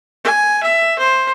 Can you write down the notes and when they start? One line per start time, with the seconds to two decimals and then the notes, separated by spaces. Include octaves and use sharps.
0.25 G#5
0.63 E5
0.98 C5